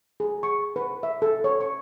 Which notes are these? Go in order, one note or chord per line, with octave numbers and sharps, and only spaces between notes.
G#4
C#6
B4
E5
A4
C#5
C#6